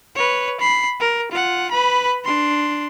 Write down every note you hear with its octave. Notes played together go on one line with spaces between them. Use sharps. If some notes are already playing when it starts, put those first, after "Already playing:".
B4 C#5
B5 C7
A#4
F4 F#5
B4 B5
D4 C6